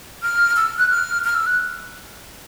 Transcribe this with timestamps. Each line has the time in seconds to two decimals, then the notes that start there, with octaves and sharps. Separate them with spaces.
0.22 F6
0.56 E6
0.78 F#6
0.90 F6
1.24 F6
1.35 E6
1.46 F#6